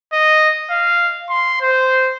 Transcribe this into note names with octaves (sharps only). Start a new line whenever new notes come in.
D#5
F5
C6
C5